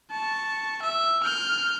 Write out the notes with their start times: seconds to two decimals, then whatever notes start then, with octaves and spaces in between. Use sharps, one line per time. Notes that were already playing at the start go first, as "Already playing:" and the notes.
0.11 A5 C#6
0.82 E5
1.24 F6 G6